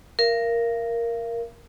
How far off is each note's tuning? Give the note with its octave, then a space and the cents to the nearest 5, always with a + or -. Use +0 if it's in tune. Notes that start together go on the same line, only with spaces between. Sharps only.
A#4 +0 F5 -35